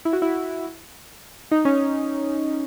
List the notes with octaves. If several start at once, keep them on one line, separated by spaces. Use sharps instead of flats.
E4
F#4
E4
D#4
C#4